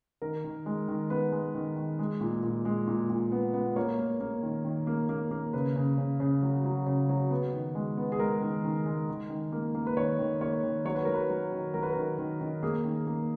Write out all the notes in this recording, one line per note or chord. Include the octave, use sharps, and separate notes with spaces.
D#3 A#4
D#3
G#3
D#3
B3 B4
G#3
D#3
D#3
G#3
A#2
A#2
G#3
A#2
A#2
B3
B3
A#3 C#5
A#3
A#3
D#3
D#3
A#3
A#3
A#3
C#3 B4
C#3
C#3
C#3
F#3
F#3
C#3
F#3
B3
D#3
G#3
B3
G#4
G#3 A#4
D#3
D#3
G#3
D#3
D#3
A#3
A#3
B4
D#3 C#5
D#3
A#3 C#5
D#3
F#3 C#5
B4
F#3 A#4
B4
F#3
D#3
F#3 A#4
B4
D#3 A#4
D#3
D#3
A#3 G#4
D#3
A#3